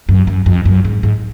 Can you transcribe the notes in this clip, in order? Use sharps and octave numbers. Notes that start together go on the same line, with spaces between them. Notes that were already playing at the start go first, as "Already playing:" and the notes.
F#2
F#2
F2
F#2
G#2
G#2